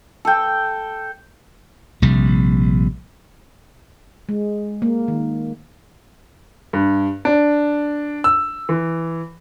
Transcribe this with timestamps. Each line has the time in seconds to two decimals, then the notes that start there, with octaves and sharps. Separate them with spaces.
0.25 A4 G5
2.02 A#1 C3 G3
4.29 G#3
4.82 A#3
5.08 D#3
6.73 G2
7.25 D4
8.24 E6
8.69 E3